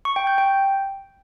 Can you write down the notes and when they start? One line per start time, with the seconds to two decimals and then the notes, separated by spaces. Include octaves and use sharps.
0.05 C#6
0.16 G5
0.27 G6
0.38 G5